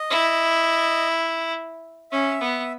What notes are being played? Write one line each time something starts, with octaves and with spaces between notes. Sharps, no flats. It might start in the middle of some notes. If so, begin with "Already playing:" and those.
Already playing: D#5
E4
C#4 E5
B3